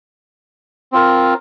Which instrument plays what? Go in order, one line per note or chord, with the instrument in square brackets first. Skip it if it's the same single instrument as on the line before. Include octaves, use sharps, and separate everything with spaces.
[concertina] C4 F4 A#4